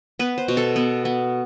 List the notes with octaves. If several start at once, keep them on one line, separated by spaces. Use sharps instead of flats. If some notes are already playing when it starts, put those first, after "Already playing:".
B3 B4
C5
B2
A4
B3
B3